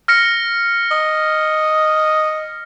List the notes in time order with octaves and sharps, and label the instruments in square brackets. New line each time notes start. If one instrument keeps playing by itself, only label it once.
[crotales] F6 A#6 C#7
[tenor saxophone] D#5